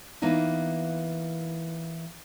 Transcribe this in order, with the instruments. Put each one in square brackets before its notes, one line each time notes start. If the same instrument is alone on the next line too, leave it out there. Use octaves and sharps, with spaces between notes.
[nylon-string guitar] E3 A#3 B3 D#4 E4